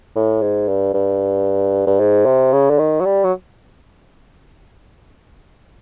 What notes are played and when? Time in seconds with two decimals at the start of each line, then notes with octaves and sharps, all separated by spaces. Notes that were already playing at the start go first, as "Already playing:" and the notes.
0.16 A2
0.42 G#2
0.69 G2
0.94 G2
1.87 G2
2.00 G#2
2.26 C3
2.53 C#3
2.70 D3
2.79 D#3
3.01 F#3
3.05 G3
3.24 F#3